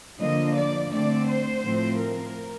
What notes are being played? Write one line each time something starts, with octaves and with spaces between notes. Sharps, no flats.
D3 F3 A#3 D#5
D5
D3 A3 C4 D5
C5
A2 F3 A3 C4
A#4